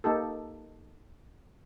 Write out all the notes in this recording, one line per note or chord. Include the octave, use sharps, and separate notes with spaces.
A#3 D#4 G4 A4